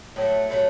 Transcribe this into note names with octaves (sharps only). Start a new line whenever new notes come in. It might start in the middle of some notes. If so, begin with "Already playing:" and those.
A2 F#3 A3
A2 F#3 A3